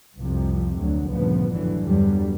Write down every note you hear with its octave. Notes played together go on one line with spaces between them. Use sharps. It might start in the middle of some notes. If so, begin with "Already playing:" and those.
C2 F2 C3 F3
D2 F#3
D2 G2 A#2 C#3 F3 B3
G1 F2 A2 D3 E3 F#3
E2 G2 D3 F#3 G3